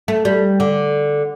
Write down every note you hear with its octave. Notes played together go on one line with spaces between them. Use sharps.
A3
G3
D3